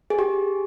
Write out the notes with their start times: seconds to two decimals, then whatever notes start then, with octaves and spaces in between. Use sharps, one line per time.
0.10 G#4
0.19 G4